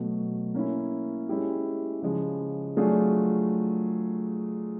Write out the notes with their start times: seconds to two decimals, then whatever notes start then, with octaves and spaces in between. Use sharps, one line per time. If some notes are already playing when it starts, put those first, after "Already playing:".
Already playing: B2 F#3 A3
0.55 A#3 C#4 E4
1.29 G#3 C#4 E4 G4
2.02 C#3 F3 G#3
2.77 F#3 A3 D4 F4 G#4